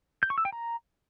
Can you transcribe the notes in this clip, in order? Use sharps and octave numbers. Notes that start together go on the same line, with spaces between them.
G6
C#6
E6
G5
A#5